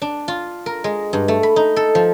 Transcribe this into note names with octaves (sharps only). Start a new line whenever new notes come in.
D4
F4
A#4
G#3
G2
A3
B5
D#4
A4
F3